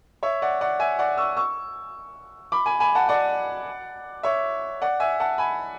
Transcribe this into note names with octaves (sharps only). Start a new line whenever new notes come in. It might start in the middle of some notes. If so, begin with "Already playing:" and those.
C#5 E5
D5 F#5
D5 F#5
E5 G#5
D5 F#5
C#6 E6
C#6 E6
B5 D6
G#5 B5
G#5 B5
F#5 A5
D5 F#5
C#5 E5
D5 F#5
E5 G#5
F#5 A5
G#5 B5